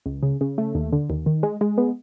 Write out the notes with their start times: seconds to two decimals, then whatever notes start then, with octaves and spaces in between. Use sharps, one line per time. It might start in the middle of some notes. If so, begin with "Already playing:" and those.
0.06 C#2
0.23 C#3
0.41 C#3
0.58 A3
0.75 D#2
0.92 D3
1.10 D#2
1.26 D#3
1.43 G#3
1.61 G#3
1.78 B3